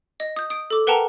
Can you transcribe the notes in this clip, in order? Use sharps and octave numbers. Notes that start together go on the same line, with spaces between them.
D#5
D#6 G6
D#6 D7
A4 D6
A#4 B4 F#5 G5 A5 A#5